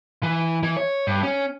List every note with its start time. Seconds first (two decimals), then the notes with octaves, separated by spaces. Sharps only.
0.23 E3
0.63 E3
0.77 C#5
1.07 G2
1.23 C#4